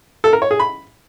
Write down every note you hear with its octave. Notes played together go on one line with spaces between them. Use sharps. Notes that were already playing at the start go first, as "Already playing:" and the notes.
A4
A#4
C#5
G#4
B5